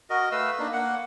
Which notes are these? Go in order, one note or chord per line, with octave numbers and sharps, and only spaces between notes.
F#4 A#4 D#5
A3 B4 F5 E6
A#3 D4 D#4
A#3 F#5